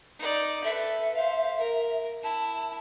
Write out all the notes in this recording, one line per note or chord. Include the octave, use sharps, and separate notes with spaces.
D#4 D5
A4 B4 E5
C5 F5
A#4
E4 A5